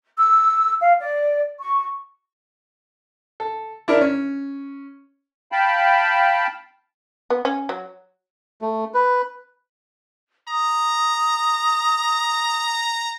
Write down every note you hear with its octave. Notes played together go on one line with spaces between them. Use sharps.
E6
F5
D5
C#6
A4
D4 E4 A#4
C#4
F5 G5 A5 B5
B3
C#4
F#3
A3
B4
A#5 D#6